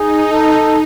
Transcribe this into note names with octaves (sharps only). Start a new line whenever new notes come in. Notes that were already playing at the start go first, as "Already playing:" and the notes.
Already playing: D#4 G#4
A4